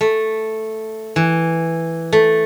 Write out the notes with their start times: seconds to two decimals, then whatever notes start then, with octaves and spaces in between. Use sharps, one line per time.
0.01 A3
1.16 E3
2.12 A3